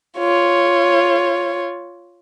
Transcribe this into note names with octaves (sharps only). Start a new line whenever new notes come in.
F4 C#5